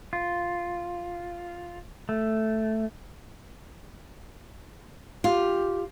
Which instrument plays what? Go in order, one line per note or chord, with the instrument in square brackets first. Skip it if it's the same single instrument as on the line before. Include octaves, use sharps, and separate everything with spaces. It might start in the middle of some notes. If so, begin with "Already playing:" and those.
[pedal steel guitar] F4
A3
[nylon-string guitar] F4 [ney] G4